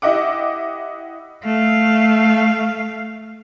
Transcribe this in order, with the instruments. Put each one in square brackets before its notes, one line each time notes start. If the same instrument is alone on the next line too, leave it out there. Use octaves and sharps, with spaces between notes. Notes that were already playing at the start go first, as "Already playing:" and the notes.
[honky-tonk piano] E4 G4 D#5 E5 F#5 D6
[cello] A3 F5